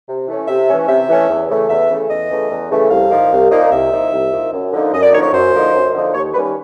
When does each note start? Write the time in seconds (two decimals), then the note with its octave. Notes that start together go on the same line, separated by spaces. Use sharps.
0.08 C3
0.28 E3 A3 C#4
0.48 C3 E5
0.69 E3 A3 C#4
0.88 C3 E5
1.09 E3 A3 C#4
1.29 E2
1.49 C#3 E3 A3
1.70 E2 E5
1.90 C#3 E3 A3
2.10 E2 D#5
2.30 C#3 E3 A3
2.50 E2
2.71 C#3 E3 A3
2.91 C2 F5
3.11 A#2 F3 A#3 D#4
3.32 C2
3.51 A#2 F3 A#3 D#4
3.71 C2 E5
3.91 A#2 F3 A#3 D#4
4.13 C2
4.32 A#2 F3 A#3 D#4
4.53 F#2
4.73 D3 F3 A#3 D#4
4.93 F#2 D#5
5.03 D5
5.13 D3 F3 A#3 D#4 C#5
5.23 C#5
5.33 F#2 C5
5.53 D3 F3 A#3 D#4
5.74 F#2
5.94 D3 F3 A#3 D#4
6.14 D#2 C#5
6.34 D#3 G3 A#3 C#4 B4
6.44 B4